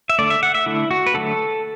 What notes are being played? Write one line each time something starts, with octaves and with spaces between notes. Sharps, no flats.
E5
D3 A3 D5
E5
F#5
E5
D3 A3 E4
F#4
B4
D3 F#3 A3 A4